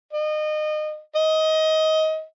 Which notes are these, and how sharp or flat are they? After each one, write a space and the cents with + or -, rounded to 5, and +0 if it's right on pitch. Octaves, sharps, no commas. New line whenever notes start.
D#5 -30
D#5 +20